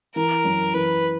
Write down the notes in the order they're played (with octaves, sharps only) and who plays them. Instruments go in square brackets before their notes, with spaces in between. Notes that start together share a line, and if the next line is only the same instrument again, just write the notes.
[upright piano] E3 [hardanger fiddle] A#4
[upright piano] F#2
[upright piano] E3 [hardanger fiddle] B4